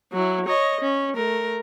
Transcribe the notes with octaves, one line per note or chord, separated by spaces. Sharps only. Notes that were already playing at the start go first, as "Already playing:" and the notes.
F#3 E4
C#5 D#5
C#4
A3 A#4